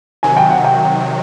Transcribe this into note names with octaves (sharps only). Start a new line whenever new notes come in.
C3 D#3 F#3 G#5
G5
F#5
G5